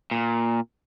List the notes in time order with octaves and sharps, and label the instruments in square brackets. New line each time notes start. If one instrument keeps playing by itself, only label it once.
[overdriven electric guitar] A#2